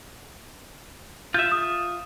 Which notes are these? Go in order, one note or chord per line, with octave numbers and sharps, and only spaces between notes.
F4 E5 G6
D#6